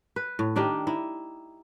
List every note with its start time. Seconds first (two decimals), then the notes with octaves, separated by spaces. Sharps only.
0.16 B4
0.39 A2
0.56 D#3 D4 D#4 G4
0.87 D#4 E4